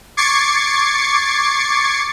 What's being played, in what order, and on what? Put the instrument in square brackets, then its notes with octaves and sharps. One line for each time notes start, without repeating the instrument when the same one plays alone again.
[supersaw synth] C#6 D6 G#6 A6 C7 C#7